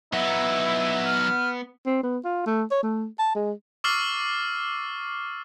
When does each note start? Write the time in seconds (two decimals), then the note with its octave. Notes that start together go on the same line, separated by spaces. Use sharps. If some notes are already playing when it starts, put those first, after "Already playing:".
0.13 F#3 B3 D#4 E4
1.05 F6
1.86 C4
2.03 B3
2.24 F4
2.46 A3
2.71 C#5
2.83 A3
3.19 A5
3.35 G#3
3.84 C#6 D6 E6 F6 A6 C7